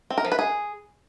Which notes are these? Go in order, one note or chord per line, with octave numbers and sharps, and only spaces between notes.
C4
A#4
F3
B4
G#4